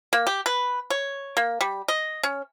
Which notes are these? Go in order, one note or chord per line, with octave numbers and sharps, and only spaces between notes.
A#3
G4
B4
C#5
A#3
G3
D#5
C#4